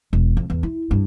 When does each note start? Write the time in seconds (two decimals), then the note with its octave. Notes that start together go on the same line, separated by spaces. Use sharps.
0.13 E1
0.37 F2
0.50 E2
0.63 E4
0.91 G2